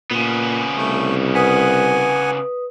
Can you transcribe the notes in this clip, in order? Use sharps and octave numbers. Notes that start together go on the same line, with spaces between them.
A#2 C#3 B3
C2 A3
B4 F#5 G#5 D#6